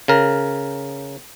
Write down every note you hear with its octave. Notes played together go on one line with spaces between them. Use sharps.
C#3 A#4